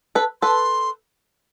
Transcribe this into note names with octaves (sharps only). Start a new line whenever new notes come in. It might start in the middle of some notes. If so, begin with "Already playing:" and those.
A4 B4
A4 B4 C6